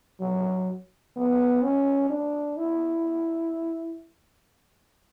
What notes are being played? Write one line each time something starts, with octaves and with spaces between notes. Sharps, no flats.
F#3
B3
C#4
D4
E4